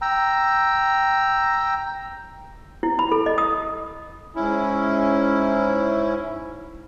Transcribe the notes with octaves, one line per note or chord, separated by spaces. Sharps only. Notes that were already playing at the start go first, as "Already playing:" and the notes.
G5 A#5 E6
E4
B5
A4
D#5
D#6
G#2 C#4 E4